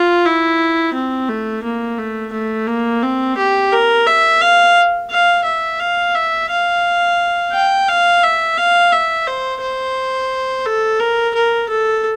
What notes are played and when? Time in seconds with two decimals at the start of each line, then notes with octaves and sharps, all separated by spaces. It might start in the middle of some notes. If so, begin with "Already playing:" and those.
Already playing: F4
0.25 E4
0.94 C4
1.28 A3
1.64 A#3
1.99 A3
2.33 A3
2.67 A#3
3.03 C4
3.38 G4
3.72 A#4
4.07 E5
4.41 F5
5.11 F5
5.45 E5
5.80 F5
6.15 E5
6.50 F5
7.53 G5
7.88 F5
8.23 E5
8.57 F5
8.92 E5
9.27 C5
9.61 C5
10.66 A4
11.00 A#4
11.34 A#4
11.69 A4